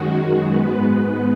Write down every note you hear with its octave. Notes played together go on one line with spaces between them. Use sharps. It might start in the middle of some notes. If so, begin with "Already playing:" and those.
Already playing: F#2 D#3 G#3 F#4
G#2 G#3 B3 B4